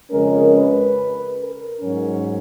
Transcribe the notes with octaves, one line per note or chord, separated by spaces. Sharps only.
F2 C#3 G#3 C#4 A#4
B4
A#4
G#2 F#3 C#4